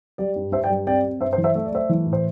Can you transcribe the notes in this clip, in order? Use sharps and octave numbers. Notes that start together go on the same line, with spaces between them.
G3 D5
G2
G2 C5 E5
D5 G5
G3
C4 D5 G5
C4
G2 C5 E5
C5
E3
C5 E5
A3 E5
D5
A3 C5 E5
E3
A2
C5